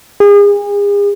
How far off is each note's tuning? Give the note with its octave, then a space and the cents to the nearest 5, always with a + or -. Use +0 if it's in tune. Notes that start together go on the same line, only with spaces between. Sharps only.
G#4 -40